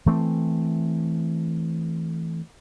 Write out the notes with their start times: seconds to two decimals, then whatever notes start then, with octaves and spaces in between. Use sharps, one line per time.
0.06 E3 A3 C4